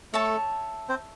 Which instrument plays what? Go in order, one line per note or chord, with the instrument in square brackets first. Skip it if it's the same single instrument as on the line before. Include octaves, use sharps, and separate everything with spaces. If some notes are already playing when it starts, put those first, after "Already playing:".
[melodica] A3 A4 [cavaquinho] C#5 E5 A5
[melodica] C4 C5